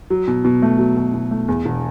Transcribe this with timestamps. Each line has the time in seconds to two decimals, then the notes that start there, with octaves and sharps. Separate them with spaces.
0.10 F#3
0.28 B2
0.45 B2
0.62 A3
0.79 F#3
0.97 B2
1.14 B2
1.31 A3
1.48 E2
1.65 E1